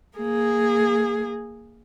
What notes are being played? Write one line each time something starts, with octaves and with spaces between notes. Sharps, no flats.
A#3 G#4